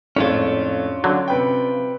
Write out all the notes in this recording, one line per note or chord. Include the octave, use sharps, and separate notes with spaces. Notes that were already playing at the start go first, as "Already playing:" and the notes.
G#1 F2 A2 C#4 D4 F4 C#5
D3 F#3
C3 B4 G5